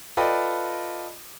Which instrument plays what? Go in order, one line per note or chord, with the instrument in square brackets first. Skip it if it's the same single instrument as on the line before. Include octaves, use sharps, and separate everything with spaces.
[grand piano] F4 A4 B4 D5 D#5 G5